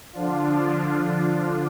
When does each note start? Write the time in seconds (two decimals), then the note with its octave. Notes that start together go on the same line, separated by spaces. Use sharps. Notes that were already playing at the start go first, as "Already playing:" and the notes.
0.13 D3 F3 D4 F4